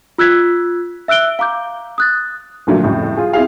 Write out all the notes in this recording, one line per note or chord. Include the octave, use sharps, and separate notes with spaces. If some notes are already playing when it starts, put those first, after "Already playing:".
F4 E6 F#6 G#6 B6
E5 E6 F#6 D7 G7
F5 A#5 D6 G6
D#6 F#6 A6
A#1 A#2 D3 F#3 A3
C2 F2 A2 C#3
F4 G#4
C4 E4 G#4 F5